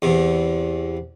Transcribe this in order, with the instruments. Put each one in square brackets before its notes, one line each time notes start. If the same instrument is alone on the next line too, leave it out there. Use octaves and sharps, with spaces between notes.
[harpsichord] E2 C3